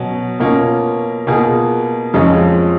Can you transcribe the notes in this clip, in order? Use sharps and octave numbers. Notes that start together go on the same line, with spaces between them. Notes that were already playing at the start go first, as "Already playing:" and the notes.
Already playing: B2 F#3 C#4
B2 A#3 C#4 F4
B2 A#3 F4 G#4
F2 F3 G#3 C#4 F4